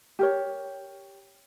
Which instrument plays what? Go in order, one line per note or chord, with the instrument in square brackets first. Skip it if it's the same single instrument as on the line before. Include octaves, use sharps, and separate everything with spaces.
[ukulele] G4 A#4 C#5